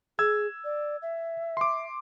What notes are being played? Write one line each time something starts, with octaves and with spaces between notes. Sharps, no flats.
G#4 E6 G#6
D5
E5
C6 D6